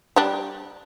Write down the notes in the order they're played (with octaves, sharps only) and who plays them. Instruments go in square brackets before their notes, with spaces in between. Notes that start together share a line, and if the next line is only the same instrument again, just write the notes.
[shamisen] G3 D4